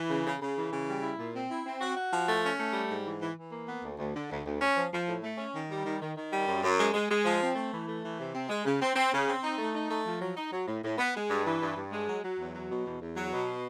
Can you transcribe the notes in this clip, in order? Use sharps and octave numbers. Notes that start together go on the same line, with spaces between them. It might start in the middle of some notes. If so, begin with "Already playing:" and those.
Already playing: E3
C#3
C#3
C#3
E3
C#3
G3
E4
A#2
C4
E4
C4
F#4
F#4
F3
A3
C#4
A3
G3
G#2
E3
E3
E3
A#3
B3
D2
D2
D3
D2
D2
C#4
F3
F3
A2
A3
C#4
D#3
G3
D#3
D#3
D#3
G3
F#2
F#2
G#3
G#3
G#3
F3
C4
A3
E3
A3
E3
C3
C4
G#3
C#3
C4
C4
C#3
C4
D#4
A3
D#4
A3
F3
F#3
D#4
F#3
A2
A2
B3
G#3
G2
E3
G2
G2
G#3
F#3
F#3
E2
F#3
B2
E2
E2
F#3
B2